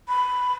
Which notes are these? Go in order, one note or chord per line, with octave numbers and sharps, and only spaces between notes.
B5